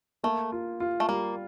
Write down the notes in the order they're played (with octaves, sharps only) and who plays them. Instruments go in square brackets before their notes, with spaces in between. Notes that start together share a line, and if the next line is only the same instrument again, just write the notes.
[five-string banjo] A3 [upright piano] A#3
[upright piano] F4
F4
[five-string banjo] A3
[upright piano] G3 [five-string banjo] A#3